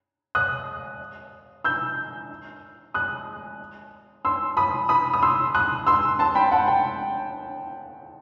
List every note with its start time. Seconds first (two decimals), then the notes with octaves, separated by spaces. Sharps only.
0.35 D#6 F#6
1.64 E6 G6
2.94 D#6 F#6
4.25 C6 E6
4.57 B5 D#6
4.89 B5 D#6
5.14 D#6
5.22 C6 E6
5.55 D#6 F#6
5.87 C6 E6
6.19 A5 C6
6.35 G5 B5
6.52 F#5 A5
6.68 G5